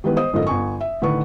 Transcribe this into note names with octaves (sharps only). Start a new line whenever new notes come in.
D#3 E3 G3 G#3 B3 B4
C5 D#5 D#6
F#1 G#2 D3 F3 A4 D#5
G1 G#5 C#6
E5
A2 D3 D#3 B4 C#6